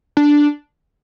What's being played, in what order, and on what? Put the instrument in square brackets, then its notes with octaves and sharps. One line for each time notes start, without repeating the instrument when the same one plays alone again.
[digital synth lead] D4